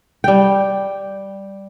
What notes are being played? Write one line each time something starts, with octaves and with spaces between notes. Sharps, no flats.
G3 G5